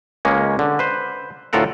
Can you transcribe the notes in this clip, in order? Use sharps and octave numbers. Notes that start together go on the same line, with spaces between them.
C#2 G#3 A#3 C#4
D3
B4 C5
D2 A2 F4 A4 A#4 F#5